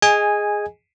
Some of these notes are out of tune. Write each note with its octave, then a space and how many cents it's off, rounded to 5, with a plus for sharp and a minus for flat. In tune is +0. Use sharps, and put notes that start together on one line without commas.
G#4 +0 D#5 +0 G#5 -10